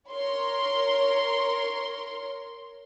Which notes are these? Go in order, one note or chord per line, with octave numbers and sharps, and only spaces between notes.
A#4 C#5 C6